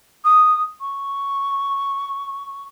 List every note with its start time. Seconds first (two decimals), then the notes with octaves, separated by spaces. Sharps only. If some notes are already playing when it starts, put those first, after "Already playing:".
0.24 D#6
0.80 C#6